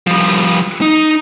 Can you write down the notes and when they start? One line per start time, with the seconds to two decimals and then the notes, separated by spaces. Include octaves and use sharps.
0.07 F3 G3
0.81 D#4